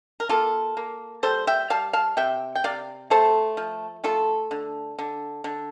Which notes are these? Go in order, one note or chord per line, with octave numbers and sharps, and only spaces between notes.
A#4
A#3 F4 A4
A#3
G3 A4 C5
E5 G5
G3 F5 A5
F5 A5
C3 E5 G5
G5
C3 D5 F5
A3 A4 C5
F3
A3 F4 A4
D3
D3
D3